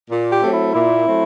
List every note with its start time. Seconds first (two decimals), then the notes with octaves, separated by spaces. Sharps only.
0.09 A#2
0.30 G4
0.41 F#3 A3 C4
0.52 E4
0.74 A#2 E4
1.06 F#3 A3 C4